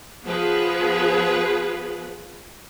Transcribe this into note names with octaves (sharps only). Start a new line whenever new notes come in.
F3 B3 G#4 B4